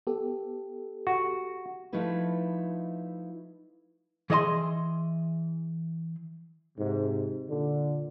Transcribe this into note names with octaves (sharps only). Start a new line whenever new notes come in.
B3 G4 A4
F#4
F3 A3 D#4 E4 B4
E3 G#4 D#5 A5 C6
G#2 C3
A#2 D3